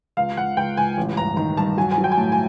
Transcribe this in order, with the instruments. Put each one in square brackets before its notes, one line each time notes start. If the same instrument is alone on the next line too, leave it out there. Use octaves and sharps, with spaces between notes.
[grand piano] C#2 [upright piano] F5
[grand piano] C#2 [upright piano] F#5
[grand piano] C#2 [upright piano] G5
[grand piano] C#2 [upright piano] G#5
[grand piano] A1
[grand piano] G2 [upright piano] A#5
[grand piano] D#3 [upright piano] A#5
[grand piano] G2 [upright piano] A5
[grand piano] F#3 [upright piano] G#5
[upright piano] G#5
[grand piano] F#3
[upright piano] G5
G#5
[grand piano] A2 [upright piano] A5
[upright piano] G#5